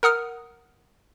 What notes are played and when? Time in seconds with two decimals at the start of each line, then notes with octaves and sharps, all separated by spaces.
0.03 A#4 F#5 D#6 F6